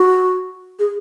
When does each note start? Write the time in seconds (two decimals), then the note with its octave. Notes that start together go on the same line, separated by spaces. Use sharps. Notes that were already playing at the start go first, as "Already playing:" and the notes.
Already playing: F#4
0.79 G#4